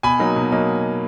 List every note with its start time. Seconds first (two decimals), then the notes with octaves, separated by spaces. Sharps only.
0.03 B2 G#5 B5
0.19 F#3 A#3 D#4
0.36 B2
0.51 F#3 A#3 D#4